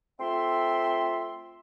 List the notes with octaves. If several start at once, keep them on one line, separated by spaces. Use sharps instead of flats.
A3 C4 F4 E5 C6